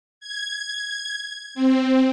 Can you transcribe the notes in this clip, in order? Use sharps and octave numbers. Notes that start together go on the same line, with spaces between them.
G#6
C4